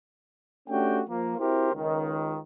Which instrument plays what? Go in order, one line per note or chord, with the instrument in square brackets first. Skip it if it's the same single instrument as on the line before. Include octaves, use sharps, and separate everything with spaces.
[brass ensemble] A3 C#4 D4 F#4 G4 G5
F3 A#3
C4 E4 F#4 G4 A#4 C5
C#2 D#3